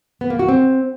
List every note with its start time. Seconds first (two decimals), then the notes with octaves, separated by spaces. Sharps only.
0.21 B3
0.30 A#3
0.39 F#4
0.49 C4